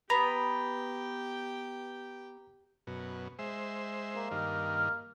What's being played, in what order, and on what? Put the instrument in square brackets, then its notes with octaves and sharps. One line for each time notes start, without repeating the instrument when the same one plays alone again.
[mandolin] B3 [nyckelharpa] G4 G5 [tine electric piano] A#5
[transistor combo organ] F#2 B2
G#3 C5 E5
[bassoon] A#3
[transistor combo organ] G2 D#3 [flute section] F6